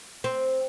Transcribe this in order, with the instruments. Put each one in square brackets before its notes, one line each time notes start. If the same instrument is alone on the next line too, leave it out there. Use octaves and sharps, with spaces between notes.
[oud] C4